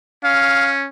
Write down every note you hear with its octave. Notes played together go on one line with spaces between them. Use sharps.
C#4 F5